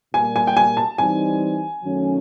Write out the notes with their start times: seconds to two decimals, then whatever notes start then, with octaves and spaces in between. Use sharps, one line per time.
0.13 A#2 G3 A#3 G#5
0.36 G#5
0.47 G5
0.57 G#5
0.77 A5
0.98 E3 G3 C4 D#4 G#5
1.83 F#2 D#3 F#3 A3 C#4